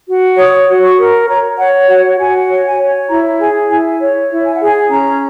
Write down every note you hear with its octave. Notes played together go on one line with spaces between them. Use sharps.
F#4
C#5 D#6
F#4
C#6
A#4
C#5 A#5
C#5 F#5
F#4 F#5
F#4 G#5
C#5
G#5
C#5
E4 A#5
G#4 G#5
E4 G#5
C#5
E4
G#5
F#5
G#4 G#5
C#4 A#5